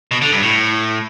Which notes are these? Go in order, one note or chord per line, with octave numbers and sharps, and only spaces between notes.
B2
D3
G2
A2